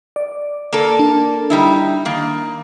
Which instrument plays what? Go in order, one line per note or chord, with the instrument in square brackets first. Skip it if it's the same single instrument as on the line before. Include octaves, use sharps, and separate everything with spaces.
[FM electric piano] D5
[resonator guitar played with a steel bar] A#3 A4
[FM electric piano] D4
[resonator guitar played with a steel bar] G3 D#4 E4
D#3 A#3